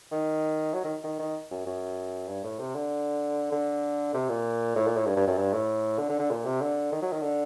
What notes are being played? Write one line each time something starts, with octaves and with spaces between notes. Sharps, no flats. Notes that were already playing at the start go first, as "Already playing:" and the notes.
D#3
F#3
D#3
D#3
D#3
F#2
F#2
G2
A2
C3
D3
D3
C3
A#2
A2
A#2
A2
G2
G2
F#2
G2
A2
D3
D3
D3
A#2
C3
D3
D#3
F#3
D#3
D3